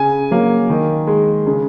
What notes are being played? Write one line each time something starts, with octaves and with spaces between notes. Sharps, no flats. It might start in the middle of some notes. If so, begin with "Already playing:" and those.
Already playing: C#3 G#5
F#3 A#3
D#3
G#3
C#3